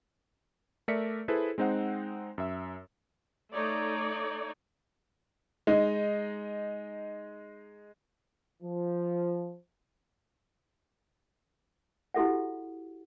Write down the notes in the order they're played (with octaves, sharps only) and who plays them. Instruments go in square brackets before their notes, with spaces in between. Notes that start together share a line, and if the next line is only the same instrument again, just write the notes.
[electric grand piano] A3 A#4 D5 E5 B6 C#7
E4 G#4 A4 B4 C5
G#3 C4 D#4 C5 F#5
F#2 E5 E6
[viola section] A3 D#4 C#5 D5
[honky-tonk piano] G#3 D#4
[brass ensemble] F3
[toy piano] E4 F#4 G4 A4 E5 F#5